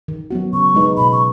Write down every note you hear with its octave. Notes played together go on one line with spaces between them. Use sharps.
D#3
F#3 B3 F#4
C#3 C#6
G#3 D#4 B4
B2 B5
C#6